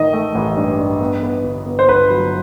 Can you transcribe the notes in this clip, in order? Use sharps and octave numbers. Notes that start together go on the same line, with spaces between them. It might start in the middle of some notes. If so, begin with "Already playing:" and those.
Already playing: A1 D#3 A3 D#5
A3
A1
G2
G2
B3
B3
G1
B3
C5
G1 B4
F#3